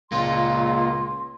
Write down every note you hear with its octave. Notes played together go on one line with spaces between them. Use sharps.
C#2 A#3 F4 C6